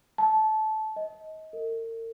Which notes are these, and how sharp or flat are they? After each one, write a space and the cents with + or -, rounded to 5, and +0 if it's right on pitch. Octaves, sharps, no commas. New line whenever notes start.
A5 -20
D#5 +25
A#4 -45